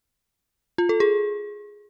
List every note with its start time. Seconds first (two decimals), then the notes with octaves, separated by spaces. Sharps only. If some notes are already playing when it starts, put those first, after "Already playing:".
0.78 F4
0.89 A4
1.00 G#4